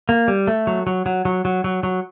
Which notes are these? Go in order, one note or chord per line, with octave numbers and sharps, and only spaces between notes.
A#3
G3
A3
F#3
F#3
F#3
F#3
F#3
F#3
F#3